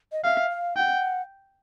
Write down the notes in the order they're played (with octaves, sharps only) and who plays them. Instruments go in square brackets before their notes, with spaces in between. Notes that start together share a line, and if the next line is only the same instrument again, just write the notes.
[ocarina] D#5
[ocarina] E5 [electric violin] F5
[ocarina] F5
[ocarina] F#5 [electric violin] G5